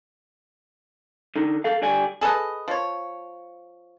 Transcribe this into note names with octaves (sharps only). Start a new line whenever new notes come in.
D3 D#4
A4 F5
D3 G3 D5 G#5
G#4 A4 B4 D#5
F3 C#5